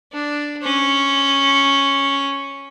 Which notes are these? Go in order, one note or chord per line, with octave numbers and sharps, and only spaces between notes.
D4
C#4